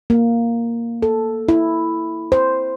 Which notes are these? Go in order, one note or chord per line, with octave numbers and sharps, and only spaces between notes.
A#3
A4
E4
C5